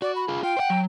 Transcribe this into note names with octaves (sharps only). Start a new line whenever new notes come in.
F#4 D5
B5
F4 G#4
F4 G5
C5 F#5
F#3